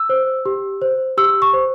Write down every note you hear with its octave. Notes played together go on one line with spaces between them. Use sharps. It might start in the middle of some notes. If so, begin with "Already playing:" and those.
Already playing: E6
C5
G4
C5
G4 E6
C#6
C5